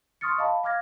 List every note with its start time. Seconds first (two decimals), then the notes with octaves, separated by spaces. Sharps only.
0.21 C6 C#6 D#6 F6 A6 C#7
0.38 D#5 F5 A5 B5
0.64 F5 D6 F6 G#6 A#6